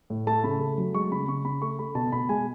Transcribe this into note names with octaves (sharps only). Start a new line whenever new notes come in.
A2
A3 A5
C#3 B5
A3
F#3
G#3 C#6
C#3 B5
C#3 C#6
C#3 B5
A3 C#6
A3 B5
B2 A5
B2 B5
G#3 G#5